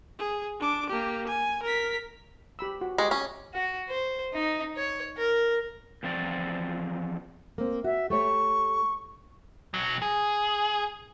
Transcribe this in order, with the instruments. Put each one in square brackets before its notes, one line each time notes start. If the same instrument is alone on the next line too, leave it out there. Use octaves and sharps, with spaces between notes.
[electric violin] G#4
D4 D6
A#3 G4
G#5
A#4 B6
[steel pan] G4 B5 E6
F#4
[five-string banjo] G#3 [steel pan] G4 G5 C#6
[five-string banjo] C#4
[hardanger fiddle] F#4
C5
D#4
C#5
A#4
[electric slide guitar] E2 F3 C4 D5
[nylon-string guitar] A#3 C4
[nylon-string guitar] F#4 [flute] E5
[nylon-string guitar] A3 G4 C#5 [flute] C#6
[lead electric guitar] B1 F#3
G#4